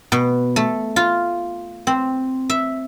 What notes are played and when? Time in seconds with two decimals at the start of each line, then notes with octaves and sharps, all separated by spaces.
0.12 B2
0.56 A3
0.96 F4
1.87 C4
2.50 E5